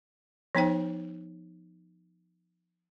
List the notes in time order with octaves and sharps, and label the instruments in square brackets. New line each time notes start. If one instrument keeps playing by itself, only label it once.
[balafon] F3 B3 D#4 C5 G5